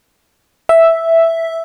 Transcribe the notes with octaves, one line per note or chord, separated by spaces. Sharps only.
E5